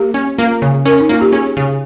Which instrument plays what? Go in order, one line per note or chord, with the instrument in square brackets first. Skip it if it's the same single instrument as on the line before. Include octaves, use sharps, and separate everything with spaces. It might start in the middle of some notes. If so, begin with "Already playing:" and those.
Already playing: [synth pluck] A#3 [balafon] G4
[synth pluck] C#4
[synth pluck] A#3 [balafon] F4
[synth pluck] C#3
[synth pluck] C#4 [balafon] A#4
[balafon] D#4
[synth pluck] A#3 [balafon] F4
[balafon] G4
[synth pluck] C#4 [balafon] G#4
[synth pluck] C#3